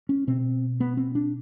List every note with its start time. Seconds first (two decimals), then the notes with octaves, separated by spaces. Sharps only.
0.09 C#4
0.27 B2 C4
0.80 B3
0.97 C4
1.15 D4